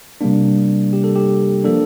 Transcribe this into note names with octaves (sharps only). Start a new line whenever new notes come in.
C3 G3 A#3 D4
G4
A4
G4
F3 A#3 D4 A4